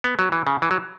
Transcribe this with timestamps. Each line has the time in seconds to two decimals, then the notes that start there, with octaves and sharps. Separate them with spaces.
0.04 B3
0.19 F#3
0.32 E3
0.47 C#3
0.62 E3
0.71 F#3